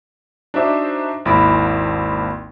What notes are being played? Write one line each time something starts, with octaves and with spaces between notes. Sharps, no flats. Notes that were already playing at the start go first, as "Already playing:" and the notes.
D4 D#4 F#4 C5 E5 D6
G#1 D#2 E4 B5 D7